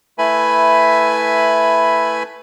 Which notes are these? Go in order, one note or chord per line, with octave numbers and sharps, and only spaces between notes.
A3 E4 B4 G#5 B5